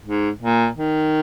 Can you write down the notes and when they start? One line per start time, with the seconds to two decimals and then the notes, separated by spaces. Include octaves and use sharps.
0.05 G#2
0.42 A#2
0.78 D#3